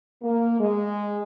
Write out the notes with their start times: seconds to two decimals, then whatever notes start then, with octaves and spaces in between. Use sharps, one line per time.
0.22 A#3
0.59 G#3